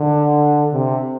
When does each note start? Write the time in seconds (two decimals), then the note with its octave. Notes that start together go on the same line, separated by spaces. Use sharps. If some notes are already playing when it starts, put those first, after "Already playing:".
Already playing: D3
0.73 C3